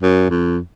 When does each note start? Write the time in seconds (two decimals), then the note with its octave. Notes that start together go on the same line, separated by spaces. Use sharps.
0.02 F#2
0.30 F2